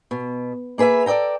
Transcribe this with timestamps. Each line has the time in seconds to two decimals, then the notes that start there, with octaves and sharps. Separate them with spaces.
0.11 B2
0.78 A#3 G#4 B4 D#5 E5
1.06 A4 D5 D#5 G5 A#5